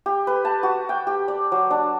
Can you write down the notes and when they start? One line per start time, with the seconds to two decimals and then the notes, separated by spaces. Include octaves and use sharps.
0.06 G4
0.27 B4
0.45 A5
0.63 F#4
0.89 G5
1.07 G4
1.28 D5
1.52 F#3
1.71 D4